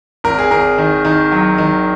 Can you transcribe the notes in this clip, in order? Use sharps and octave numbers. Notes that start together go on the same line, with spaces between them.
G#1 A#4
G#4
G#1 A#4
D#3
D#3
F#3
D#3